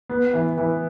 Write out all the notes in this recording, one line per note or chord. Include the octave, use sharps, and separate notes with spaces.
B3
E3
E3